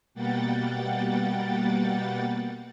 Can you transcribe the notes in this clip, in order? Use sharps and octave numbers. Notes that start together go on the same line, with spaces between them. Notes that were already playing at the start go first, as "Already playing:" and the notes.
B2 G3 A#3 F#5 G5 A6